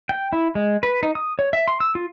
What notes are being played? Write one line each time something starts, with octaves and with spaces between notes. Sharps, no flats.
G5
E4
G#3
B4
D#4
D#6
C#5
E5
C6
E6
F4